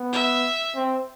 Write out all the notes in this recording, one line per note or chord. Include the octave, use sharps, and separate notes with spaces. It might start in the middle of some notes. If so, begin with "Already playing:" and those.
Already playing: B3
E5
C4